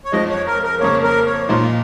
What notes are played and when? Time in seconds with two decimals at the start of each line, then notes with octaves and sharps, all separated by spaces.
0.05 C#5
0.12 F2 F3 G#3 D#5
0.30 C#5
0.46 A#4
0.63 A#4
0.80 F2 C#3 A#3 C#5
1.03 A#4
1.26 C#5
1.48 A#2 F3 A#3 D#4 F4